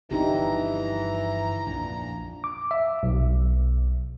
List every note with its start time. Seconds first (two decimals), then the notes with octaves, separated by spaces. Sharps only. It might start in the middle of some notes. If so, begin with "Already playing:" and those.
0.11 G1 D3 E3 F3 D4 D#4 G4 A#5
1.67 A#1 F2 D4
2.44 D6
2.71 E5
3.03 B1